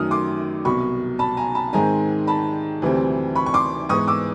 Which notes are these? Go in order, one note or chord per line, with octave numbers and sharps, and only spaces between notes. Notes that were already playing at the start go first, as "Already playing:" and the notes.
Already playing: F#2 D#3 F#3 A3 D#6 F6
C6 D6
C2 B2 F#3 B5 C#6
A5 B5
G#5 A#5
A5 B5
G#2 D#3 G#3 C4 G#5 A#5
A5 B5
D2 C3 E3 G3 C4
B5 C#6
C#6
C6 D6
G#2 E3 G#3 B3 C#6 D#6
D6 E6